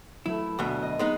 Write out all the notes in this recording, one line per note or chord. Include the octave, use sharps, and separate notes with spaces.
F#3 A3 E4
D2 B2 B3
D#5
G#3 B3 D#4